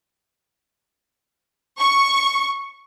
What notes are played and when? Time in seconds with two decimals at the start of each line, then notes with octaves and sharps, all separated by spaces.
1.80 C#6